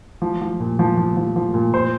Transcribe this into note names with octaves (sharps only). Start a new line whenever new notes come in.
F3
F3
A#2
F3
F3
F3
F3
A#2
A#2 C5